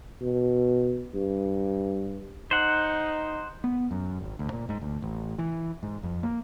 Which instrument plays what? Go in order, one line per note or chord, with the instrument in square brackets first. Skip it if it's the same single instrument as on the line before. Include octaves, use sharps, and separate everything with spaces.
[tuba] B2
G2
[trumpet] D#4 [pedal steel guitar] C5 F#5
[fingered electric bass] B3
F#2
G#1
D2
A#2
G#2
D2
A1
E3
G#2
F2
A#3